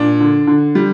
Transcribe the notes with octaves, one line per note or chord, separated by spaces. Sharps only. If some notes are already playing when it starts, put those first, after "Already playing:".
Already playing: A#2 D4
D3
D3
G3